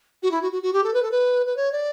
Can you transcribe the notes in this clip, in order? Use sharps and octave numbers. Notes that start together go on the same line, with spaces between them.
F#4
E4
F#4
F#4
F#4
G4
A4
B4
A4
B4
B4
C#5
D5